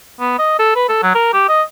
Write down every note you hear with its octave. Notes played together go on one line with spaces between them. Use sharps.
B3
D#5
A4
B4
A4
F#3
A#4
G4
D#5